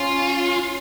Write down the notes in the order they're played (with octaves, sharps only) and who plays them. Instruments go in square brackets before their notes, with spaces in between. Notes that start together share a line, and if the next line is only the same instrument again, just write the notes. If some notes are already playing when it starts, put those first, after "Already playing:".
Already playing: [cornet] C#4 [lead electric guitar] F4